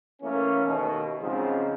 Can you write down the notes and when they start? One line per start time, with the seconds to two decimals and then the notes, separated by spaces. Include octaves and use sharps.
0.22 E3 A3 A#3 C#4
0.65 D#2 B2
1.21 G#2 C#3 F3 F#3 G#3 C4